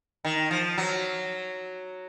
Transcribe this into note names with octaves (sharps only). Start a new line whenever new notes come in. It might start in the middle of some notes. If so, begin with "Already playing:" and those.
D#3
F3
F#3